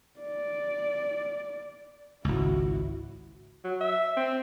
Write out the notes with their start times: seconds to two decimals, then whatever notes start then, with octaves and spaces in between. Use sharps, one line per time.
0.20 D5
2.25 G#1 C#2 E4 F#4
3.64 F#3
3.81 E5
4.17 C4